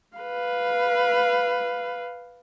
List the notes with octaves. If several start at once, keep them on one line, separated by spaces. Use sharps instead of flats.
B4 F5